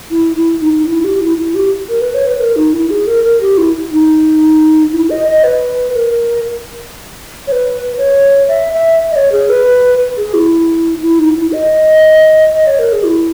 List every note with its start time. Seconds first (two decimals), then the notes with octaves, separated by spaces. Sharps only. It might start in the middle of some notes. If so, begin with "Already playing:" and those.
0.11 E4
0.37 E4
0.62 D#4
0.87 E4
1.04 G4
1.21 E4
1.38 E4
1.55 G4
1.89 A#4
2.01 B4
2.14 C#5
2.27 B4
2.40 A#4
2.56 D#4
2.73 E4
2.90 G#4
3.07 A#4
3.24 A#4
3.41 G4
3.58 E4
3.92 D#4
4.93 E4
5.10 D#5
5.27 D#5
5.44 B4
5.94 A#4
7.47 C#5
7.52 B4
7.98 C#5
8.48 E5
8.74 E5
9.12 D#5
9.16 C#5
9.32 G#4
9.50 B4
10.17 G#4
10.34 E4
11.02 E4
11.19 D#4
11.36 E4
11.52 D#5
12.54 D#5
12.67 C#5
12.79 A#4
12.92 G#4
13.05 E4